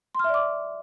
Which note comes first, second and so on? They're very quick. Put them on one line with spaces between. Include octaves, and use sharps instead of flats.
C6 F6 E5 D5 D6